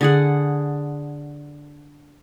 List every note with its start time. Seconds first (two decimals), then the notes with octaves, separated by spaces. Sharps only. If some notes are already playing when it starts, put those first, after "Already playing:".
0.01 D3 G#4 F#5